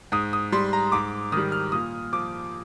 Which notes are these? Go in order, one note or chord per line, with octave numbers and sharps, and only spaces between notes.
G#2 D#6
D#6
G3 C6
A#5
G#2 D6
D#3 G3 D#6
F6
A#2 D#6
F3 D6